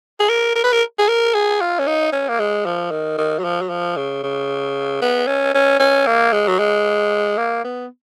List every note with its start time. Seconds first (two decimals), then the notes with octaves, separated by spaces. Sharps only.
0.20 G#4
0.29 A#4
0.55 A#4
0.64 B4
0.72 A#4
0.99 G#4
1.08 A#4
1.34 G#4
1.61 F4
1.79 C#4
1.87 D#4
2.12 C#4
2.29 A#3
2.39 G#3
2.66 F3
2.91 D#3
3.18 D#3
3.39 F#3
3.44 F3
3.61 F#3
3.70 F3
3.97 C#3
4.23 C#3
5.02 B3
5.27 C#4
5.55 C#4
5.80 C#4
6.06 A#3
6.33 G#3
6.48 F#3
6.59 G#3
7.38 A#3
7.64 B3